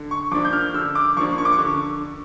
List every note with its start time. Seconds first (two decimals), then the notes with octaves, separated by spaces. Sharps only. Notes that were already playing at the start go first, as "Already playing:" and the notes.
Already playing: D3
0.11 C#6
0.31 F3 A#3 D4 D6
0.45 G6
0.53 F6
0.74 D3 E6
0.95 D6
1.17 F3 A#3 D4 C#6
1.38 C#6
1.45 D6
1.52 C#6
1.59 D3